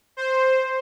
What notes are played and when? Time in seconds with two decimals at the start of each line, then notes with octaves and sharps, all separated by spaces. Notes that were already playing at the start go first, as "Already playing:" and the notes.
0.17 C5